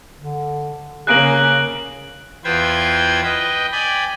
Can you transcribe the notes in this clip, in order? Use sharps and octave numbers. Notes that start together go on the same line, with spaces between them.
D3
C#3 A#3 G#4 F#6 D7 F#7
E2 F4 B4 C5 G5 G#6
B4 D#5 G5
D5 G5 G#5 B5